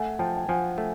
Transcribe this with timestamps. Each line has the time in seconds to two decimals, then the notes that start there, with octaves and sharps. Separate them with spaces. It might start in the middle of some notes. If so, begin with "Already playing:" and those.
Already playing: A3 F#5 G#5
0.19 F3 G5 A5
0.37 G5
0.49 F3 F#5 G#5
0.78 A3